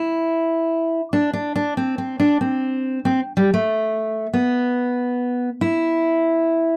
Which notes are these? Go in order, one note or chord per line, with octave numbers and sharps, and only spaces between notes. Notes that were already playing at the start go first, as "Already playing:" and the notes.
Already playing: E4
D4
D4
D4
C4
C4
D4
C4
C4
G3
A3
B3
E4